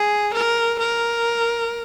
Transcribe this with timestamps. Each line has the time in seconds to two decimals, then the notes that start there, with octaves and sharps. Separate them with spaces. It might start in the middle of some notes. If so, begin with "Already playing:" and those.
Already playing: G#4
0.34 A#4
0.79 A#4